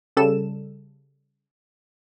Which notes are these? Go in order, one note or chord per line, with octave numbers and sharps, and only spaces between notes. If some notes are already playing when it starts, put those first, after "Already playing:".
C#3 G3 A4 E7